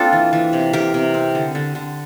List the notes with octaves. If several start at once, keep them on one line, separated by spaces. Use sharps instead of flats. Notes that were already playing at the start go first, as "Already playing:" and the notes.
Already playing: A#3 C4 D4 F4 A4
E3
E3
C3
C3 G4 A#4
C3
C4
D3
D3
D3